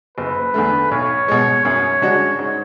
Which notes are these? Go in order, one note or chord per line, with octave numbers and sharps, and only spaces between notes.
F#1 B4
E2 D3 A3
B1 C#5
B2 G#3
F#2 C#5
C#3 G#3 D4 F#4
G#2